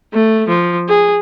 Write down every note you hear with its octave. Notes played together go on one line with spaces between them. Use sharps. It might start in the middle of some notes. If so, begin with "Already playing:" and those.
A3
F3
G#4